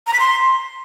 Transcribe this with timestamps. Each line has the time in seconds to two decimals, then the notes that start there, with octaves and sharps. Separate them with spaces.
0.07 A#5
0.13 B6
0.20 C6